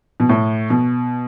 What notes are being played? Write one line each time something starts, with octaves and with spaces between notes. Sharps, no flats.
B2
A2
B2